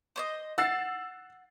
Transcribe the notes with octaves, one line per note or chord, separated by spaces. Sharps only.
C5 C#5 D#5
F#5 E6 A6 C7